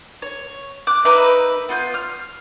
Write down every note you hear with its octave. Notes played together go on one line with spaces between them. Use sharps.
C#5
D6 F#6
D#4 A#4 B4 E5
B3 F4 F#6 G6
F6